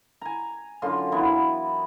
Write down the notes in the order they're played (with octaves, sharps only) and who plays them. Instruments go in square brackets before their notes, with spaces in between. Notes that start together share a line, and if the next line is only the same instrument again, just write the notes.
[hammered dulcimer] G#5 A#5
F#2 D3 F4 C6
E3 B3 A#4